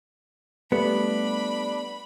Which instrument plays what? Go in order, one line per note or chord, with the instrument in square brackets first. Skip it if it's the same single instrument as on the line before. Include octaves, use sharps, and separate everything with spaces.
[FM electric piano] G3 A3 [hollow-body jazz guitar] B3 [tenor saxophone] D4 [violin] B5